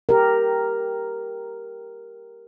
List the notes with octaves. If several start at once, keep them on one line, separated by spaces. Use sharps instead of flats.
G4 A#4